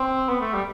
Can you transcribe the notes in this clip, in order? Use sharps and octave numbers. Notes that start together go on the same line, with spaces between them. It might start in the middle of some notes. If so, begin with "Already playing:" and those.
Already playing: C4
B3
A3
G3